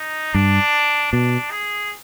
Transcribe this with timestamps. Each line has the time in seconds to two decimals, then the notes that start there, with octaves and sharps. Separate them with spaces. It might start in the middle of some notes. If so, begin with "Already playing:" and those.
Already playing: D#4
0.34 G2 D4
1.12 B2 D4
1.51 G#4